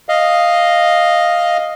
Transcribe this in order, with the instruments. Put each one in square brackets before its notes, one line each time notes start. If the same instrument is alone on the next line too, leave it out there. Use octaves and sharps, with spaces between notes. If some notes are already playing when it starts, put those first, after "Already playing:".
[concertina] D#5 F5